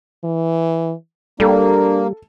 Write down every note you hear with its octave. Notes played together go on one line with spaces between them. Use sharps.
E3
G3 A#3 D4 A4